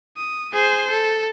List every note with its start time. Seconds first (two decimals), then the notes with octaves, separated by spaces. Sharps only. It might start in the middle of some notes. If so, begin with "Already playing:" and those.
0.17 D#6
0.53 G#4 C5
0.90 A4